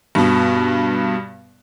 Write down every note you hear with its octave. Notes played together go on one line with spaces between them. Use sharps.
G2 B2